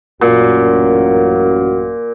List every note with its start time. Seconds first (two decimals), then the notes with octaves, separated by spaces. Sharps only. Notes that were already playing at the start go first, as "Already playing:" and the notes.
0.21 A1 F#2 A#2 F#4